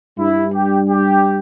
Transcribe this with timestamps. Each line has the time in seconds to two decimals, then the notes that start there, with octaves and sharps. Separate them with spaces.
0.19 G2 G3 E4
0.55 G4
0.90 G4